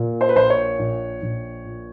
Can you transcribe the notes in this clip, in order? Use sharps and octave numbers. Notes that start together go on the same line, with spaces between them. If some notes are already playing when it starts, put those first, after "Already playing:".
Already playing: A#2
C5
B4
A#1 C5
C#5
A#1
A#1
A#2